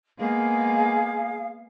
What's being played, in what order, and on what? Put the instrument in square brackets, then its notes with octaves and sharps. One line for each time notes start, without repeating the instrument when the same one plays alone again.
[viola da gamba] G#3 A#3 B3 [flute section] G#4 F5